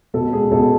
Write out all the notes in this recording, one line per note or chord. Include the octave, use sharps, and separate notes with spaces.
B2 A4
G#3 G#4
B2 A4